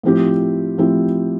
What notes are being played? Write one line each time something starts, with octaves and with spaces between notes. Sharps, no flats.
A2 F3 C4 E4 G4
A2 F3 C4 E4 G4